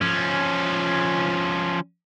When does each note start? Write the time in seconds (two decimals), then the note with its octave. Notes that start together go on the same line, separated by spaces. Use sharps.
0.01 F3 C#4